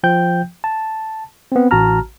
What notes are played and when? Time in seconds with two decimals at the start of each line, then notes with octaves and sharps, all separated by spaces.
0.04 F3 G5 G6
0.64 A5
1.52 B3 C4
1.71 A1 F#4 A5 A#5 F6